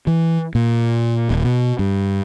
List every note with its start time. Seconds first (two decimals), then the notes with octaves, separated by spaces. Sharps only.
0.07 E3
0.55 A#2
1.30 D#1
1.44 B2
1.79 G2